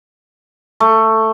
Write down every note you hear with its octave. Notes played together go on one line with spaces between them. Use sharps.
A3